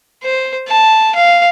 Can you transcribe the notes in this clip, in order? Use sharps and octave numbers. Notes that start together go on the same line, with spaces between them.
C5
A5
F5